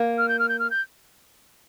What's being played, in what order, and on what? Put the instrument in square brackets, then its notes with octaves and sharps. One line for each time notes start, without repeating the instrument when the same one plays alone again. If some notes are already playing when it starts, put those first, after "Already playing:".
Already playing: [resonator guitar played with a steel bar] A#3
[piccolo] F6
G6
F6
G6
F6
G6